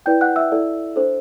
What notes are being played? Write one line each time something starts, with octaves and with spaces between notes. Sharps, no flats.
E4 B4 D5 G5 G6
F#5 F#6
E5 E6
E4 A4 D5
D4 A4 C5